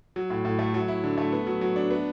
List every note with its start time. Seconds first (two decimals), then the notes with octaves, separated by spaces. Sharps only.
0.16 F#3
0.30 A2
0.45 A2
0.59 A3
0.74 F#3
0.88 E4
1.04 D3
1.18 A3
1.33 B3
1.47 F#3
1.61 F#3
1.76 D4
1.91 B3